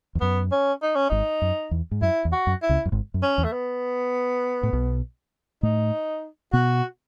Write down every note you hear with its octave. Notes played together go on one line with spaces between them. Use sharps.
E2
F#2 B3
C#4
D#4
C#4
G#1 G#2 D#4
F#2
E2
G#2
F#2 E4
E2
F#4
F#2
E4
C#2 C#3
F#2
G#1 G#2
F#2
C#4
E2
A3
B3
A2
B1 B2
A2 A3 D#4
B2 B3 F#4